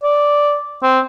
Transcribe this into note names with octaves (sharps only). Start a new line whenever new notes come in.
D5
C4